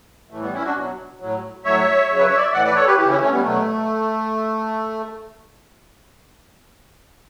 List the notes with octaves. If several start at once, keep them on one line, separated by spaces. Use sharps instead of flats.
A2 E3 A3
G3 B3
C#4 E4
D4 F#4
B2 F#3
A2 F#3
A2 F#3 C#5 E5
C#3 F#3
B4
C#5
D5
E5
A2 E3 D5 F#5
B4 D5
A4 C#5
G4 B4
C#3 E3 E4 G4
C#4 E4
A3 C#4
G3 B3
B2 F#3 A3